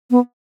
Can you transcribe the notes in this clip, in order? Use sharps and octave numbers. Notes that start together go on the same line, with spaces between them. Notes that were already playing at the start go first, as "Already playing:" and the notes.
B3